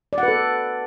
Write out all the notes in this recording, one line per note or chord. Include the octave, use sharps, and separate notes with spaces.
D5
F#5
B4
A4